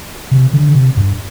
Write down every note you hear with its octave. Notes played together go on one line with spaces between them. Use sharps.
C3
D3
C3
G2